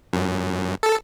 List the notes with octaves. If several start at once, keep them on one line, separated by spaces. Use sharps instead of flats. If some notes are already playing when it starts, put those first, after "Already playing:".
F#2
A4